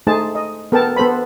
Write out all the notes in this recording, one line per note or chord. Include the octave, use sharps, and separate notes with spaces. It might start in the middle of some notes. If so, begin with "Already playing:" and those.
A3 D#4 G#4 C5 A5
D#5
B3 A4 A#4 G5 A5
B3 A4 C5 B5